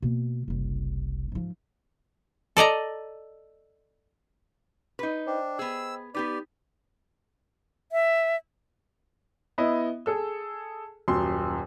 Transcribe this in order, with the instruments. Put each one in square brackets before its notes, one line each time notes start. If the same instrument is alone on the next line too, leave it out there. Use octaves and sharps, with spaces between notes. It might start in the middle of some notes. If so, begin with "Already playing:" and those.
[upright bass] B2 A#3
F#1 C2
G#2 F3
[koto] A4 D5 D#5 A#5
[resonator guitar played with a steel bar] D#4 B4
[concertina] D4 [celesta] C5 D#5 G5
[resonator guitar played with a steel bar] B3 G#4 [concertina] E6
[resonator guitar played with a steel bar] B3 G4 B4 [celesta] D#4 [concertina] D5
[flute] E5
[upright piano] B3 E4 D#5
G#4 A4 E6
D#1 F#2 C6